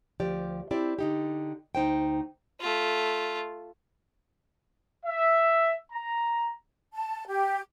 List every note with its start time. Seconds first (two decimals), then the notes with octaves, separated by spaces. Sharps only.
0.20 D2 F3 G4 D5
0.71 C4 E4 G4 D5
0.99 D3 D#4 G4
1.75 D2 D#4 C5 G5
2.61 A3 F4
5.06 E5
5.92 A#5
6.94 A5
7.27 G4